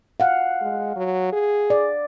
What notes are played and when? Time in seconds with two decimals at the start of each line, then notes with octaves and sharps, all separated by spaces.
0.20 F5 F#5
0.61 G#3
0.96 F#3
1.32 G#4
1.70 D5